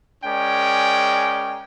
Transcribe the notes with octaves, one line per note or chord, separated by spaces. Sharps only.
G#3 C#4 A#4 D5 G5